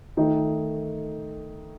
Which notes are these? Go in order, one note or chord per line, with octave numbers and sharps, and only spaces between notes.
D#3 A3 D#4